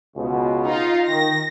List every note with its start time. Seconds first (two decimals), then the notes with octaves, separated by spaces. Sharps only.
0.16 C#2 B2
0.67 D#4 F4 F5
1.08 D#3 A#6